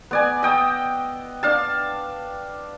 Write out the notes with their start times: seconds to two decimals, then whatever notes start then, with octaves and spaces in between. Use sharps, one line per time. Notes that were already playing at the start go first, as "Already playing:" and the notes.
0.11 B3 D5 G#5
0.43 D#5 G5 D#6 E6
1.43 D4 F5 A5